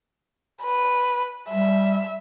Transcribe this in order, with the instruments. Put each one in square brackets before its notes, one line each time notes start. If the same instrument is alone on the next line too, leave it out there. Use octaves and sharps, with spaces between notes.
[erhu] B4
[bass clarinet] G3 [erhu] E5